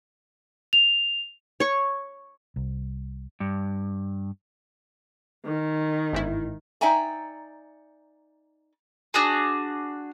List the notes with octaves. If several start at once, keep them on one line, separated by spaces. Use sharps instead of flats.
F7
C#5 C#6
C2
G2
D#3
G1 G#2 E4
D#4 D5 E5 G5 G#5 A#5
D4 F#4 G#4